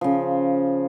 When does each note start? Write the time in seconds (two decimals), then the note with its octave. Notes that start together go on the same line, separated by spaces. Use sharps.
0.01 C#3 F3